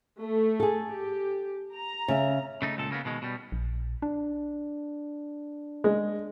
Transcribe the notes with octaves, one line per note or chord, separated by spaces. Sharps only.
A3
G#4 A4
G4
A#5
C#3 E5
C#3 A3 D#4
C#2 A#2 A4
C#3 A#3 B3
B2 D#3 G#3
B2 G3
A#1
D4
G#3